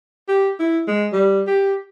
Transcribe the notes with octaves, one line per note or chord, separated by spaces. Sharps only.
G4
E4
G#3
G3
G4